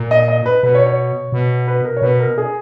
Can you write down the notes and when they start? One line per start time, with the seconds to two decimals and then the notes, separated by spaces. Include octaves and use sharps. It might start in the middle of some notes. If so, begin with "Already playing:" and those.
Already playing: A#2
0.11 D#5
0.28 D#5
0.46 B4
0.63 B2 B4
0.75 C#5
0.87 C#5
1.32 B2
1.68 B4
1.85 A#4
1.97 C#5
2.02 B2 B4
2.20 A#4
2.38 G#4